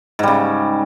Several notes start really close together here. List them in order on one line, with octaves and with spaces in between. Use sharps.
G#2 G3 C#3